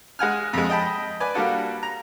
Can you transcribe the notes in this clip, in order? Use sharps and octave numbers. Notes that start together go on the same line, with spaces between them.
G#3 F#5 G#5 F6
F2 G#3
D#5 G5 A5 B5
B4 D5 G#5
G3 A#3 D4 F4 F#4 A4
A#5